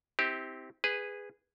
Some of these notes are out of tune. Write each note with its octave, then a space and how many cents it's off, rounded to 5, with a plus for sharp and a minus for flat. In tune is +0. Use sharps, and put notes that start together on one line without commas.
C4 -5 E4 -35 G4 +0
G#4 -15 B4 +10